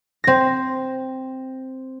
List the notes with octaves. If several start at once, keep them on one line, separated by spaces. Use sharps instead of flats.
C4 A#6